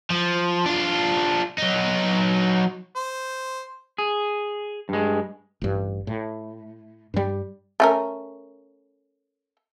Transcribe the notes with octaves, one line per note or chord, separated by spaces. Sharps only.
F3
D4 F4
F#3 D#4
C5
G#4
G2 G#3
A1 G2
A2
G2 G3
A3 C#4 A#4